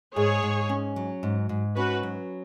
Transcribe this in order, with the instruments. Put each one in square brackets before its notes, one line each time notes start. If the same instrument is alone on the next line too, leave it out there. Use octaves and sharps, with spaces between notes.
[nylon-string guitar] G#2 [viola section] G#4 C#5
[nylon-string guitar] G#2
C#4
F#3
G#2
G#2
[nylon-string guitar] C#4 [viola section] F#4 B4
[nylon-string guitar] F#3